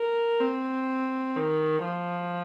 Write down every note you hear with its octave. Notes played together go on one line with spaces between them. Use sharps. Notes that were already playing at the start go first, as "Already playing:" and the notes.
Already playing: A#4
C4
D#3
F3